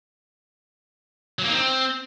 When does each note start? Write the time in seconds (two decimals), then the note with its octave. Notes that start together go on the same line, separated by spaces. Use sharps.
1.39 F#3
1.44 A#3
1.49 D#4
1.54 C4